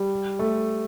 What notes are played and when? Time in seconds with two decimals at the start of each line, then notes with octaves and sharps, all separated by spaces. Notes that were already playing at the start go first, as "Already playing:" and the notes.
Already playing: G3
0.39 A3